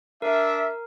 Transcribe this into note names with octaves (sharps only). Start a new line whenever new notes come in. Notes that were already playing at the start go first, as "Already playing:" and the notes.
D4 A#4 E5